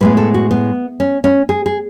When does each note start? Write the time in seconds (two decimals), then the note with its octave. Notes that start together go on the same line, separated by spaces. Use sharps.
0.01 A2 G#3 B3 B4
0.17 A4
0.34 F#4
0.51 B3
1.00 C#4
1.24 C#4
1.49 G#4
1.66 G#4